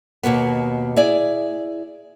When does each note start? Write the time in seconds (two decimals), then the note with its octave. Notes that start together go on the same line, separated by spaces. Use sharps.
0.23 D#2 B2 A#3 B3
0.96 E4 G#4 D5